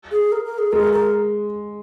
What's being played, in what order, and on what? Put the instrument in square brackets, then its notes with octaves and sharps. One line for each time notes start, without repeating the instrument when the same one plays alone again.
[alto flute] G#4
A#4
A#4
G#4
[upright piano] G#3 [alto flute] A#4
[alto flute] A#4